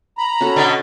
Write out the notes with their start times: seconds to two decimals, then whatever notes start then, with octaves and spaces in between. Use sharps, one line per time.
0.18 A#5 B5
0.41 C#4 F#4 A4
0.56 B2 D3 D#5